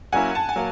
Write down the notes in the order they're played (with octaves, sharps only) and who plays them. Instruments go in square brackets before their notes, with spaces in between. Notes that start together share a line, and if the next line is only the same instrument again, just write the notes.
[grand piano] F#3 A#3 C#4 E4 [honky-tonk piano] F#5 G#5
[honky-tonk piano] A5
G#5
[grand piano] F#3 A#3